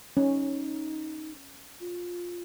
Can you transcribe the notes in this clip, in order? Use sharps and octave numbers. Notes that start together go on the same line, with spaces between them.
C#4 D#4
F4